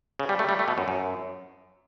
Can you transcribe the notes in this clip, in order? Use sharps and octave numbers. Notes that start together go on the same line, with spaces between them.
C#3
G3
A3
G3
A3
B2
F#2
F#2